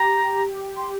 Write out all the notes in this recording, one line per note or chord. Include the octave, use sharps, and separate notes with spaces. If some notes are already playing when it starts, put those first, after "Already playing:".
Already playing: G4 A#5
C6